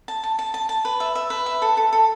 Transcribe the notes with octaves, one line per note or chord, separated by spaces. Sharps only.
A5
A5
A5
A5
A5
B4
E5
E5
B4
E5
A4
A4
A4